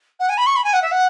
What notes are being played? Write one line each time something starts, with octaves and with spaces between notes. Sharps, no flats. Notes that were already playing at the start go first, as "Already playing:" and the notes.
F#5
G#5
B5
C#6
B5
G#5
F#5
E5
F#5